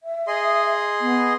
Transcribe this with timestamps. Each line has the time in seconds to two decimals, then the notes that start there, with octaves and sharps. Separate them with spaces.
0.03 E5
0.27 G#4 D#5 C6
1.01 B3